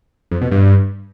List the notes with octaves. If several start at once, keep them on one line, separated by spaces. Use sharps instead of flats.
F2
B2
G2